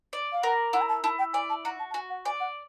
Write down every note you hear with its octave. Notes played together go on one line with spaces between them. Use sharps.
D5
F5
A#4 F#5
E4 F#5
A#5
A5
E4 A5
G5
D5 G#5
A5
F#4 A#5
A5
A5
F#4 G#5
F#5
D5 G#5
F#5